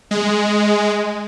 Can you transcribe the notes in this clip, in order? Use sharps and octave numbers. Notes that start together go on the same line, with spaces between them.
G#3